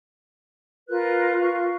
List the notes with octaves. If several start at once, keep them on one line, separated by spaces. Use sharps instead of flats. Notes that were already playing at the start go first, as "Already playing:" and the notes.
F4 A#4 B4 F#6
F4 F5 C#6